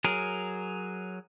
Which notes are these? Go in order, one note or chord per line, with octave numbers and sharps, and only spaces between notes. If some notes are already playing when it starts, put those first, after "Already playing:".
F#3 G#4 A#4